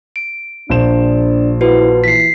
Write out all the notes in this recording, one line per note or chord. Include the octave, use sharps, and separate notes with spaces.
D7
A#1 D4 C5 E7
E4 F#4 B4
E3 B6 C7